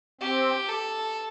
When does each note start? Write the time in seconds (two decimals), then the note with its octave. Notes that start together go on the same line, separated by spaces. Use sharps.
0.21 C4 G4
0.69 A4